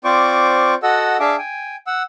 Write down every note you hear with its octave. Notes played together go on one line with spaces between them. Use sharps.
C4 F4 C5 D5 C#6 D6
F#4 A4 D#5 F#5 E6
D4 G#4 E5 F5 A5 D6
G5 G#5
F#5 E6